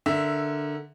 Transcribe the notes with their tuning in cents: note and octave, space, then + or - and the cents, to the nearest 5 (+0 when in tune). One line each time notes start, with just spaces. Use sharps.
D3 +5 A#4 +0 E5 +0